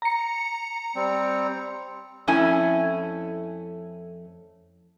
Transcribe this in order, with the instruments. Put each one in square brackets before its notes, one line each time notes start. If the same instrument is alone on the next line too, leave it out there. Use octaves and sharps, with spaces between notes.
[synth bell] A#5 C#7
[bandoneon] G3 C4
[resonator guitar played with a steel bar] F2 A3 C#4 E4 G#5